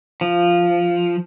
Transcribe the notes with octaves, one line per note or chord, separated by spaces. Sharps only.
F3